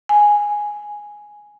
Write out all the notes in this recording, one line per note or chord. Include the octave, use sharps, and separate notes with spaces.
G#5